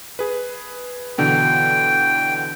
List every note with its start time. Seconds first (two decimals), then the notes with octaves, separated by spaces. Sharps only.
0.19 G#4 B4
1.18 B2 D3 E3 G5